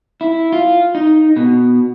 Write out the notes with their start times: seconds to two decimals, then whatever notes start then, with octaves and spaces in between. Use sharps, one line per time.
0.21 E4
0.53 F4
0.95 D#4
1.36 B2